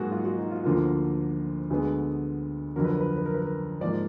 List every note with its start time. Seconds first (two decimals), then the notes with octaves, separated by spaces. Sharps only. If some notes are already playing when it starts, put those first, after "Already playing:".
Already playing: G#2 F#3 A#3 F#4 G#4
0.12 F4
0.25 F#4
0.38 D#4
0.51 F4
0.64 D2 D3 F3 A#3 F4
1.70 D2 D3 G#3 B3 G#4
2.76 F2 D3 F#3 A#4
2.85 B4
2.92 A#4
3.01 B4
3.09 A#4
3.17 B4
3.26 A#4
3.34 B4
3.42 A#4
3.81 G#2 F3 A#3 D5